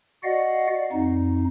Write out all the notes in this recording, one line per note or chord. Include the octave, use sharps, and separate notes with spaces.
F#4 D5 D#5 F5 F#5
F2 D#4